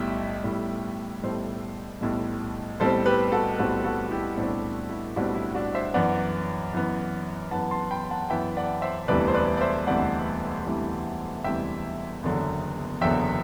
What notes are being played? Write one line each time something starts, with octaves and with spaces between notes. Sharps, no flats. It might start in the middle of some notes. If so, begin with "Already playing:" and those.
Already playing: B1 A2 G3 E5 G5
B1 A2 G3
B1 A2 G3 A4 C5
B1 A2 G3
B1 A2 G3 C4 A4 C5
G4 B4
F#4 A4
B1 A2 G3 C4 F#4 A4
F#4 A4
E4 G4
B1 A2 G3 C4 D4
E4
B1 A2 G3 C4 D4 F#4
E4
D4 F#4
C5 E5
F#2 E3 B3 D5 F#5
F#2 E3 B3
F#2 E3 B3 F#5 A5
A5 C6
G5 B5
F#5 A5
F#2 E3 B3 E5 G5
D5 F#5
C5 E5
E1 D2 C3 E3 G3 B4 D5
C5
B4 D5
D5
C5 E5
E1 D2 C3 E3 G3 D5 F#5
E1 D2 C3 E3 G3
E1 D2 C3 E3 G3 E5 G5
F#1 E2 D3 F#3
F#1 E2 D3 F#3 E5 G5